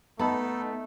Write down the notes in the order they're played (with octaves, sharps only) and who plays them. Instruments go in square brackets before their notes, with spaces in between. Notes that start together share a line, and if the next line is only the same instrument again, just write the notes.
[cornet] A3 [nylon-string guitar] B3 [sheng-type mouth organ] D#4 A4 [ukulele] A5 B5